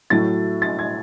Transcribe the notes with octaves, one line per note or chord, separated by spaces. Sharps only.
A2 F#3 A3 A6
A6
G#6